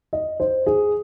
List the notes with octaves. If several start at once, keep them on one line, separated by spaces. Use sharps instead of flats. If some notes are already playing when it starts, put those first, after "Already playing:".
D#5
C5
G#4